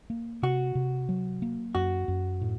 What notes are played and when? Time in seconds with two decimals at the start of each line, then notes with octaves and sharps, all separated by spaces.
0.10 A#3
0.43 C3 F#4
0.75 C3
1.09 F#3
1.42 A#3
1.75 F#2 F#4
2.08 F#2
2.41 A2